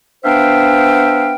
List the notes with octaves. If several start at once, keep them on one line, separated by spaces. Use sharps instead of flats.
B3 D4 C5 E5 F5 G5